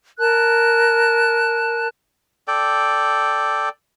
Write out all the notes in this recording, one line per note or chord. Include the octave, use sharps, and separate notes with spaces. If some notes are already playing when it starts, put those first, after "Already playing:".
A#4 A5 F#6
A4 D5 G5